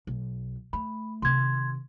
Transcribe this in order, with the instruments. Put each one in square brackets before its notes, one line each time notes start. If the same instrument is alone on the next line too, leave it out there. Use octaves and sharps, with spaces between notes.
[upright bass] B1
[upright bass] A3 [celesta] B5
[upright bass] C3 D#3 [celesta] C6 G#6